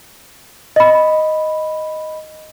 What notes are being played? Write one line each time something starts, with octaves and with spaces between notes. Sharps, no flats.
D#5 B5